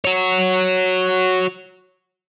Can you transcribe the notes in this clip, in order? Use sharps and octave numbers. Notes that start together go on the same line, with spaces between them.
F#4 C#5